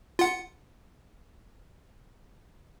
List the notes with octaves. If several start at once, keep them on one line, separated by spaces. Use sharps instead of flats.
F4 F#5